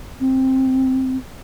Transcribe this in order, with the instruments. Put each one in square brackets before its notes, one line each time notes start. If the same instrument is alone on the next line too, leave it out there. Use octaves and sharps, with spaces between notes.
[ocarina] C4